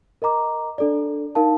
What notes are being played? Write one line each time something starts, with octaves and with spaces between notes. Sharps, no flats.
A#4 D#5 A#5 D6
D4 A4 D5
D#4 A#4 F5 A5